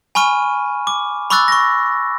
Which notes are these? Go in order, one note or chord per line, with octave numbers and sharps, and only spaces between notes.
G#5 B5 C#6 F6 D#7
D6
B5 C#6 D6 E6 F#6 A6
C#6 A#6